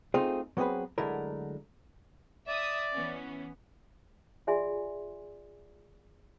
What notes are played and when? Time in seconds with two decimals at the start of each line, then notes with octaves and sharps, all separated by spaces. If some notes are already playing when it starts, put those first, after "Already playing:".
0.14 A3 C4 D#4 F4 G#4
0.57 F#3 B3 C4 F#4 G#4 B4
0.98 D3 F#3 G#3 A3 E4 A#4
2.48 D5 E5 D#6
2.92 E3 B3 C#4
4.47 F4 G#4 D5 E5 G#5 C6